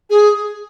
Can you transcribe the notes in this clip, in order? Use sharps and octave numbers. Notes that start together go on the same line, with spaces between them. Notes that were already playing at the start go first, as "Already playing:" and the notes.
G#4